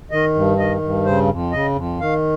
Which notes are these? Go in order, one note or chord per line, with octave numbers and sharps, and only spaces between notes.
D#3 D#5
G2
D#3 D#5
G2
C#3 C5
F2
C#3 D#5
F2
D#3 F5